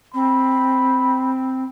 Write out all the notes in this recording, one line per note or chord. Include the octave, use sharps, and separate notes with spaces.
C4 B5